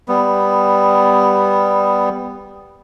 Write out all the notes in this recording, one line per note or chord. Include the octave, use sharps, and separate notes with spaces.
G3 B3